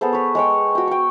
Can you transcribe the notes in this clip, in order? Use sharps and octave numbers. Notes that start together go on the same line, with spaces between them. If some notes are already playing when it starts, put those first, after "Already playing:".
B3 G#4 A4 C5
B4 C#5
G#3 C#5 G5
F#4 G5
G5 C#6